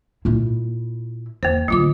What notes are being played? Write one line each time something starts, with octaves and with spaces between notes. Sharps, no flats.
A#2 E4
E2 A#3 C5
A2 D3 F#3 F4 D6